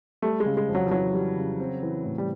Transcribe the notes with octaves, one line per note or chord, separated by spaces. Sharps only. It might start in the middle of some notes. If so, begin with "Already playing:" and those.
G3 A3
G#3
C#3
G#3
F2
F#3
F3
E3 F#3
G3
C#3
C4
E3
A2
G3